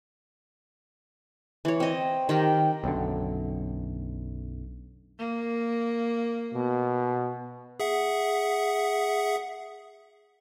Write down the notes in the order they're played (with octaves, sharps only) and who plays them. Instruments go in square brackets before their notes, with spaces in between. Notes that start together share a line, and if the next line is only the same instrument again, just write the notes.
[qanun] E3 C#5
C4 D#5
D#3 G4 A#4
[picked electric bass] B1 F#2 D3
[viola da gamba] A#3
[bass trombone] B2
[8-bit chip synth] G#4 E5 F#5